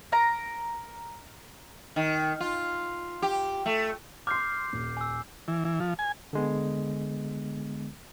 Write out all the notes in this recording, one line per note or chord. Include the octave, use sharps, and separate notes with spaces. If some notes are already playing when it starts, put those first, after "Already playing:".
A#4 A#5
D#3
F4
G4
A3
C6 D6 F6 G6 C7
D#1
G#5 E6
E3
E3
F3
G#5
D3 G#3 B3